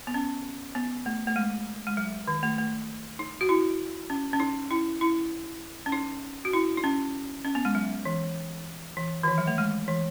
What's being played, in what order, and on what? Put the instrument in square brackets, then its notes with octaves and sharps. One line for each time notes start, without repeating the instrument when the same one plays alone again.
[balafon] B3
C#4
B3
A3
A3
G#3
G#3
F#3
D#3
A3
A3
D#4
F#4
E4
C#4
C#4
D#4
E4
E4
C#4
D#4
F#4
E4
D#4
C#4
C#4
B3
G#3
F#3
E3
E3
D#3
E3
F#3
A3
G#3
E3